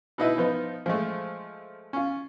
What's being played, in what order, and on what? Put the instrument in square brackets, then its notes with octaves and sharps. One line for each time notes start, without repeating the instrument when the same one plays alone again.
[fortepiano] B2 D#4 E4 B4
F3 B3 D#4
F3 G#3 A3
C#4 F4